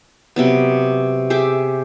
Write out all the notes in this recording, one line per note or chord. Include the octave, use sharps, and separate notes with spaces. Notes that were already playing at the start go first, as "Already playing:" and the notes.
C3 F#3 B3
G4 G#4 E5 D6